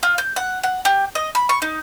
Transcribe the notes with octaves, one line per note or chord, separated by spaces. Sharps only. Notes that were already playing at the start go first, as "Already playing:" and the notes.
F4
G6
F#5
F#5
G4
D#5
B5
C#6
D#4